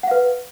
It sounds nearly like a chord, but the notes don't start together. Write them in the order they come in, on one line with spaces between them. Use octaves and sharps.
F#5 F5 B4